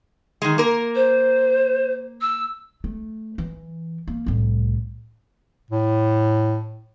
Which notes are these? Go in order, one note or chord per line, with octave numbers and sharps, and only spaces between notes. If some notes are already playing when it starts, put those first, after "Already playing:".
D#3 G#3
A#3 A#4
C5
E6
A3
E3
A#3
C2 A2
A2